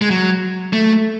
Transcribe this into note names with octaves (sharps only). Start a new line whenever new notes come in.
G#3
F#3
A3